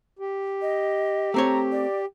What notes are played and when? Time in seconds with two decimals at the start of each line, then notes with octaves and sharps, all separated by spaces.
0.19 G4
0.62 D#5
1.34 A3 C4 C#5 A#5
1.72 D5